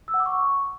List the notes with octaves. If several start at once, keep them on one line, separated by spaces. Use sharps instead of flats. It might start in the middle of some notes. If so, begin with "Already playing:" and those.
E6
F#5
D6
C#6